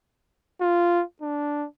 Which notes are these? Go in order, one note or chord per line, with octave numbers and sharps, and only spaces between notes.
F4
D4